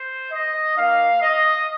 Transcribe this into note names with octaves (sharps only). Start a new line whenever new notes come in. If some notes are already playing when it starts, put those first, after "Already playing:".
Already playing: C5
D#5
A#3 D#4 F5
D#5